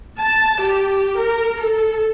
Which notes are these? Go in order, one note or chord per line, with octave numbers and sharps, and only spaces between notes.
A5
G4
A#4
A4